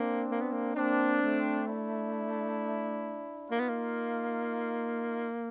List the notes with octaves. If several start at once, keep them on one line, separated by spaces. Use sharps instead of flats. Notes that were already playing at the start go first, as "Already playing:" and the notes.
Already playing: A#3 C4 D4
A#3
B3
A#3
A#3 C4 D4
A3
D4 E4
A#3 D#4 F4
B3
A#3